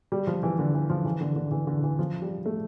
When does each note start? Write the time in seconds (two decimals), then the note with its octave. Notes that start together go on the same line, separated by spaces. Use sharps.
0.12 G3
0.27 F3
0.43 E3
0.59 D3
0.74 E3
0.90 F3
1.05 E3
1.21 D3
1.36 D3
1.51 E3
1.67 D3
1.83 E3
1.99 F3
2.22 G3
2.46 A3